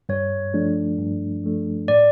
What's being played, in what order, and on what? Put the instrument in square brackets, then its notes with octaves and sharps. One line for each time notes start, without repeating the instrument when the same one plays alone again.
[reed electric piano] G2 [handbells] C#5
[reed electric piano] F3 A3 D4
G2
F3 A3 D4
[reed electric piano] A2 [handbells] D5